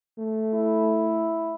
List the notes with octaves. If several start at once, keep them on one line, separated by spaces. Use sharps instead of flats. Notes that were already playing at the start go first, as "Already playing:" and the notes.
A3
E4